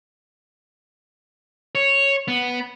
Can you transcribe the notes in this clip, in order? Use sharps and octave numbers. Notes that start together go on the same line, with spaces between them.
C#5
B3